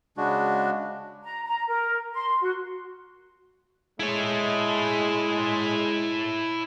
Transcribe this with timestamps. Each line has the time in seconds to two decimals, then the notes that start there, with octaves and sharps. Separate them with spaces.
0.17 C#3 G#3 D4 F#4
1.24 A#5
1.45 A#5
1.68 A#4
2.14 C6
2.42 F#4
4.00 G#3 E4 C#5